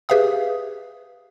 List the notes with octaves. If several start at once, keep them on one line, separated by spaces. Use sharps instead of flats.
G4 G#4 B4 E5 F5 D#6